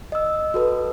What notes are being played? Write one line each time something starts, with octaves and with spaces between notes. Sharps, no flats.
D#5 E6
F#4 A4 B4